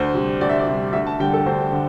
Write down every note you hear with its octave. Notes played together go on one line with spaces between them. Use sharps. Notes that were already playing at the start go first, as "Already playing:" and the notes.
Already playing: D2 C5
C3 G3
D2 D5
E5
D5
C3 G3
D2 E5
A5
D3 G3 G5
A4
D2 C5
D3